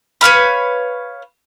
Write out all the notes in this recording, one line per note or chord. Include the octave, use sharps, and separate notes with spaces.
B4 C#5 F5 B5